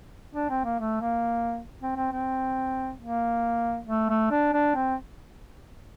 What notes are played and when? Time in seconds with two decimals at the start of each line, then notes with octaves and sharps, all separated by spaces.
0.35 D4
0.50 C4
0.65 A#3
0.80 A3
1.01 A#3
1.83 C4
1.97 C4
2.12 C4
3.00 A#3
3.88 A3
4.10 A3
4.31 D4
4.53 D4
4.75 C4